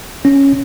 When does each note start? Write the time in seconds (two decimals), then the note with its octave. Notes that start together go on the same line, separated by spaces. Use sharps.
0.25 C#4